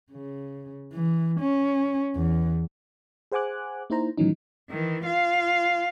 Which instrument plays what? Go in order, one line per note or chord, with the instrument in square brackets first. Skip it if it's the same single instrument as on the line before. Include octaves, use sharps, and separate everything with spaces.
[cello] C#3
E3
C#4
E2
[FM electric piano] G#4 C5 F#5 G#5 D6 F#6
A#3 D#4 E4 C5 A#5
A2 D#3 E3 F#3 C#4 D#4
[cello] D#3 E3
F4 F5